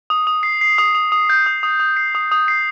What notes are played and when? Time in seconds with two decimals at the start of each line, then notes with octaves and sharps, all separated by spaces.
0.10 D#6
0.27 D#6
0.43 C7
0.61 C7
0.78 D#6
0.95 D#6
1.12 D#6
1.30 G6
1.46 D#6
1.63 D#6
1.80 D#6
1.97 C7
2.15 D#6
2.32 D#6
2.48 C7